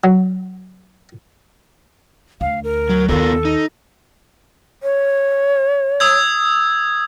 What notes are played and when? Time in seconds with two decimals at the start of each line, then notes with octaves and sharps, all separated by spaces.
0.04 F#3
2.41 D2 F5
2.64 A#4
2.90 F#3
3.08 D#2 D#3 B3 F4 A4 A#4
3.45 D#4
4.83 C#5
6.00 D#6 E6 G#6